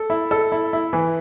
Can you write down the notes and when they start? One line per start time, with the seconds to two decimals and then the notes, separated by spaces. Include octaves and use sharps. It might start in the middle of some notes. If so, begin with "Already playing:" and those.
Already playing: A4
0.10 E4
0.31 A4
0.52 E4
0.73 E4
0.93 E3